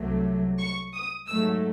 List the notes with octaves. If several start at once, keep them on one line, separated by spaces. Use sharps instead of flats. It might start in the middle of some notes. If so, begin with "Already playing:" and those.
Already playing: C2 C3 F#3 A3
C#6
D#6
G#2 F#3 A3 E6